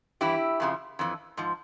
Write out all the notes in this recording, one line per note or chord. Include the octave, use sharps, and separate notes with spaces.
G2 E3 E4 G4
F2 C#3 F3
F2 E3
G#2 F3